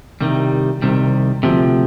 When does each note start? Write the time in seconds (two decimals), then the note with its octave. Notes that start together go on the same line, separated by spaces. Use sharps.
0.21 C2 C3 D#3 G3
0.82 C2 C3 D#3 G3
1.43 D2 C3 F3